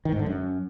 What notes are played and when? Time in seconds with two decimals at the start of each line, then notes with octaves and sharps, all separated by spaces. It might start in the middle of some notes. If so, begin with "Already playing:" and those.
0.05 D#3
0.12 G#2
0.19 D3
0.26 F#2